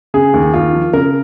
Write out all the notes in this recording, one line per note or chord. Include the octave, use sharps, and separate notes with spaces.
C#3 G#4
D#2
D#2 F4
F3
C#3 A#4